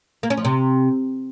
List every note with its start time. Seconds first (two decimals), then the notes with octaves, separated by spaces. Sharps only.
0.23 A#3
0.30 C#4
0.37 F3
0.45 C3